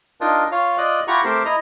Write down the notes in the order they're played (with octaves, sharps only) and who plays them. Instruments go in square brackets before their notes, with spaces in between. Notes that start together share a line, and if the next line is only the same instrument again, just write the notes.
[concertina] D4 D#4 F4 A#4
F4 C#5 F5
F4 D5 D#5 F#6
E4 F4 G4 F#5 A#5 C#6
A3 C4 G4 A#4 C5
E4 D#5 A#5